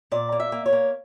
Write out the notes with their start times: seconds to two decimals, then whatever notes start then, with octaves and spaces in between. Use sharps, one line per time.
0.12 A#2 D5
0.32 A#3
0.40 E5
0.52 A#3
0.66 C#5
0.73 A#3